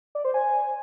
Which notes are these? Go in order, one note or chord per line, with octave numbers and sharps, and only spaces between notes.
D5
C5
G#5